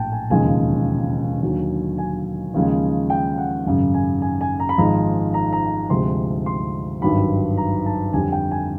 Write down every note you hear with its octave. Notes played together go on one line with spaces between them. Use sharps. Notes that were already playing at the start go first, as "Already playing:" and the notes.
Already playing: A#1 A2 G5 A5
G#5
E1 D#2 C#3 F3 G#3 G#5
D#2 D3 F#3
G#5
D#2 C#3 F3 G#3
G5
F#5
G#1 F#2 C#3
G#5
G#5
G#5
A#5
B5
G#1 G#2 F3 G#3 A#5
A#5
A#5
D2 C3 F3 G#3 C6
C6
G#1 G2 D#3 F#3 B5
A#5
A5
F2 D3 G3 G#5
G5
G#5